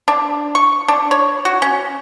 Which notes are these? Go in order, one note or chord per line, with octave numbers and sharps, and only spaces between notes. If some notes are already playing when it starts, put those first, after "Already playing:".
D4
C#6
D4
C#5
F#4
C#4